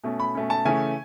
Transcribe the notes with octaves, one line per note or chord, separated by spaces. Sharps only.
B2 A3 C#4
B5
B2 A3 C#4
A5
C#3 E3 A3 C#4 G#5